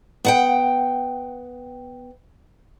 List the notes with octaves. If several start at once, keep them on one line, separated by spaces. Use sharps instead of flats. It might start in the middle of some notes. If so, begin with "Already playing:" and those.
B3 F#5 G5